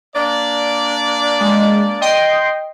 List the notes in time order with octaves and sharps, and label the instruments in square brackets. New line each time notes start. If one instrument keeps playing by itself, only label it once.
[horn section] A#3 D4 D5
[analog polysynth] G#3
D#5 G5 C6